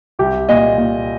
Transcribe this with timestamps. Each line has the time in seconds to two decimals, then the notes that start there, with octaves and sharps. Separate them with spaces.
0.19 C2 G4
0.49 A#2 D#5
0.78 A#2